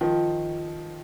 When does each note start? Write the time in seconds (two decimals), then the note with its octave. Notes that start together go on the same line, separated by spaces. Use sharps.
0.01 D#3 F3